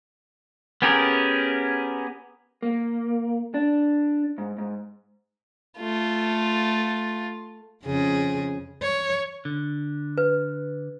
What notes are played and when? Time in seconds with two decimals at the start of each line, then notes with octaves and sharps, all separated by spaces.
0.82 B3 C#4 G4 G#4 A#4
2.63 A#3
3.54 D4
4.38 G#2
4.58 G#2
5.78 A3 F4
7.85 F2 C#3 G#4
8.82 C#5
9.45 D3
10.18 B4